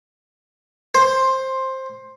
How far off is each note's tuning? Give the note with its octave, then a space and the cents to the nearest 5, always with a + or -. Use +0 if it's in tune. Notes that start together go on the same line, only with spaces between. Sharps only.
C5 +10